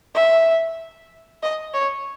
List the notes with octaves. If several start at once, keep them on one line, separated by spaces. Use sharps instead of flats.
E5
D#5
C#5